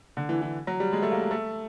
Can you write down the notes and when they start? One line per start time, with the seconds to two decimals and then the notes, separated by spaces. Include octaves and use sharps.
0.17 D3
0.29 E3
0.42 E3
0.67 F#3
0.80 G3
0.93 G#3
1.02 A3
1.12 A#3
1.31 A3